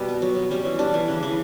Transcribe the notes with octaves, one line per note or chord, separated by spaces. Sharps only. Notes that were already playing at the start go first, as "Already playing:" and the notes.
Already playing: B2 G3
B3
F#3
B3
G3 C#4
E3
G3 D4
E3
C#3
E3